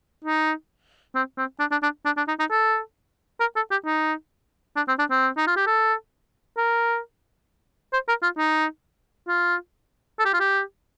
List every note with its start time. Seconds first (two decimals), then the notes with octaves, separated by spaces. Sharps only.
0.24 D#4
1.15 C4
1.37 C4
1.60 D4
1.71 D4
1.83 D4
2.05 D4
2.17 D4
2.28 D#4
2.39 D#4
2.51 A4
3.40 A#4
3.56 A4
3.71 G4
3.85 D#4
4.76 D4
4.88 C4
4.99 D4
5.11 C4
5.37 D#4
5.47 F4
5.56 G4
5.67 A4
6.57 A#4
7.93 C5
8.08 A#4
8.23 F4
8.38 D#4
9.28 F4
10.19 A4
10.25 G4
10.34 F4
10.40 G4